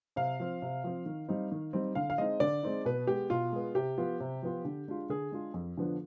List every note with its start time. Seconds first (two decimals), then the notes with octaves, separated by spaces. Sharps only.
0.16 C3 F5
0.40 F3 C4
0.62 C3
0.84 F3 C4
1.06 D#3
1.29 G3 C4 D#4
1.52 D#3
1.73 G3 C4 D#4
1.95 D3 F5
2.10 F5
2.18 G#3 C4 D#4 D#5
2.40 D3 D5
2.63 G#3 C4 D#4
2.85 B2 B4
3.07 G#3 B3 G4
3.30 B2 F4
3.52 G#3 B3
3.75 C3 G4
3.98 F3 B3 F4
4.20 C3
4.42 F3 B3 F4
4.65 D3
4.87 G#3 D4 F4
5.09 D3 G#4
5.32 G#3 D4 F4
5.54 F2
5.77 D3 F3 B3 D4